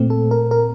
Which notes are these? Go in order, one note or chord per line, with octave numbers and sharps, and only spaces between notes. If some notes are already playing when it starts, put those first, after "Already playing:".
Already playing: A#2 A3 C4
A4
A#4
A#4